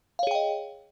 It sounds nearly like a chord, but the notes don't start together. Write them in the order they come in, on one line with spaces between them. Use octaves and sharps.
F5 C#5 G#4 G5 D#5